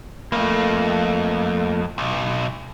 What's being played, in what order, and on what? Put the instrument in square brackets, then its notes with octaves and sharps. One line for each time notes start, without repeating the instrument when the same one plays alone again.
[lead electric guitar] F2 [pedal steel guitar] A3 A#3
[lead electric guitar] B1